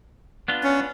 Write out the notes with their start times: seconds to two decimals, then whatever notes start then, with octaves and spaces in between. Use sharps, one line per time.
0.48 B3 D4 F4
0.63 C#4